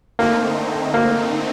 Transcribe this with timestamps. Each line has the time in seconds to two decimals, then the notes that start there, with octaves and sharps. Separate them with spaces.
0.19 D3 A3 A#3 C4 D#4
0.94 A#3